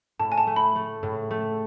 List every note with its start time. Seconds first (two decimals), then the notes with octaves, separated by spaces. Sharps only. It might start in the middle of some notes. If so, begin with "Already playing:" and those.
0.19 A2 A5
0.32 G#5
0.38 A5
0.47 A3
0.56 B5
0.76 A3
1.03 A2
1.31 A3